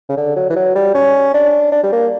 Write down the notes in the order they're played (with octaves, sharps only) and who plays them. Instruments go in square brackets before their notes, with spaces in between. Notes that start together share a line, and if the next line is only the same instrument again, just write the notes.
[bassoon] C#3
D3
F#3
E3
F#3
G3
C#4
D4
D4
G3
A#3